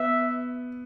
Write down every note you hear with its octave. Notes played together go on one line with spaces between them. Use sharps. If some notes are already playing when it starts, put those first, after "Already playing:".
Already playing: B3 E5